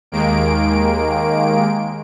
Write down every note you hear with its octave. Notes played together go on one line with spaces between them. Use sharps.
D#2 D#3 G#3 A#3 D7